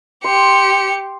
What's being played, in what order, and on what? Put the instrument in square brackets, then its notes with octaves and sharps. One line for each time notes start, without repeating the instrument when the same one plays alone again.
[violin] G4 C#7 [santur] C6